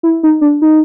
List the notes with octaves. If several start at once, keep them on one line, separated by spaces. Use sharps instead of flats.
E4
D#4
D4
D#4